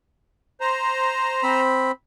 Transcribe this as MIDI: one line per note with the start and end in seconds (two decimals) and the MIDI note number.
0.61 1.61 72
0.61 1.61 82
1.43 1.91 60
1.43 1.91 83